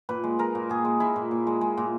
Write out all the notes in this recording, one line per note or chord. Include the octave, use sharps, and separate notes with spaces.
A#2 B4
G#3
G#3 A#4
A#2
A#2 G#4
G#3
G#3 E4
A#2
A#2
G#3
G#3
A#2